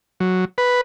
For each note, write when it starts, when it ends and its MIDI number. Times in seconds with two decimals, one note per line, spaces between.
0.20 0.45 54
0.58 0.81 71